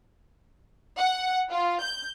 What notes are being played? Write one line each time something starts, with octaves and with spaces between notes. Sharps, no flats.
F#5
F4
G6